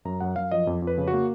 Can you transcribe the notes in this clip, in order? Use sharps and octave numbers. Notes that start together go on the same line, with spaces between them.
F#2 A#5
F#2 F#5
F#2 F5
F3 D#5
F2
F2
B4
C#3
F#4
A#3